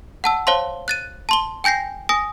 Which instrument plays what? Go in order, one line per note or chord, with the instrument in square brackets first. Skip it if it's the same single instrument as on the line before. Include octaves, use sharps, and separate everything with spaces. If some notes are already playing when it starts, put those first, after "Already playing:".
[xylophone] F#5 A5 E6
C5 C#5 F5 A5 C6
F#6 A6 D#7
A5 C6 G7
G5 G#5 G6 A#6 C7
G#5 D#6 A#6